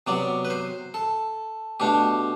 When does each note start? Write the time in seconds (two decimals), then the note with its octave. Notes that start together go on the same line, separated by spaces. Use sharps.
0.07 C3 F#3 B3 D5
0.45 B4
0.50 C5
0.94 A4
1.80 B2 A3 D4 G4